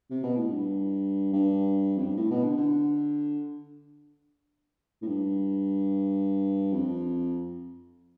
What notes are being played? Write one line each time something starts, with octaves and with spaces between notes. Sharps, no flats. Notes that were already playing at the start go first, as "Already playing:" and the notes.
C3
B2
A2
G2
G2
F2
G2
A2
B2
D3
D3
A2
G2
F2